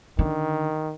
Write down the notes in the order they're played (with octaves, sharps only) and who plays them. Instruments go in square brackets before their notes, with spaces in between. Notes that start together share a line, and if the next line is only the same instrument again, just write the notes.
[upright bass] D3 [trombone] D#3